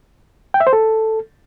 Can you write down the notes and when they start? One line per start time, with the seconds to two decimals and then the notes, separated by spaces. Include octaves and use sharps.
0.54 G5
0.60 E5
0.67 C5
0.73 A4